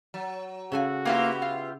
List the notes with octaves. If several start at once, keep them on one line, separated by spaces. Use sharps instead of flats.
F#3
C#3 F#4 A4 G#5
A#3 B3 E4 F4 G4
F4